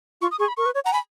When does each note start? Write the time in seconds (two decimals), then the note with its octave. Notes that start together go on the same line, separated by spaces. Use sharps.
0.21 F4 C#6
0.31 D#6
0.39 G#4 C#6
0.48 B5
0.57 A#4 C#6
0.66 B4
0.75 C#5
0.85 F#5 A#5
0.92 G#5 B5